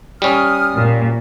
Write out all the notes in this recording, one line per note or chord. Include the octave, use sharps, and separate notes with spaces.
G3 C#4 D#6 F6
A#2